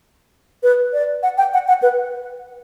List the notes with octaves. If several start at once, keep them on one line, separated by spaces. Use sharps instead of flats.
B4
D5
F#5
G5
F#5
F#5
B4